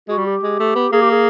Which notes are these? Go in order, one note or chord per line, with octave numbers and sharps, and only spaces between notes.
G#3 F#4
G3
G4
G#3
A3
B3
A#3 G#4
G4
G#4